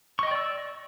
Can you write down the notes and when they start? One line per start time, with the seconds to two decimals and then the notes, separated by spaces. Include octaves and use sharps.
0.19 C#6
0.23 D#5
0.27 G5
0.31 D5
0.35 E6